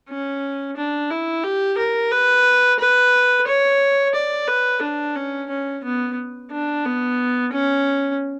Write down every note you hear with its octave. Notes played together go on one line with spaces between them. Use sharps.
C#4
D4
E4
G4
A#4
B4
B4
C#5
D5
B4
D4
C#4
C#4
B3
D4
B3
C#4